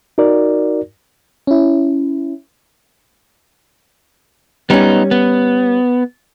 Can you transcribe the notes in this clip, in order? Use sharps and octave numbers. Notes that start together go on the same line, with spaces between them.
D#4 F#4 A#4 D5
C#4 E4
G3 B3 C#4 D#4
B3